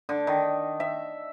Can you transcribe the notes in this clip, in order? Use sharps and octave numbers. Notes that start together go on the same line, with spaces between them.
D3
D#3
E5